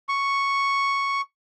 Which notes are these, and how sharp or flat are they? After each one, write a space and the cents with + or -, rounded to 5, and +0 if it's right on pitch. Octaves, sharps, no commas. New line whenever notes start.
C#6 +0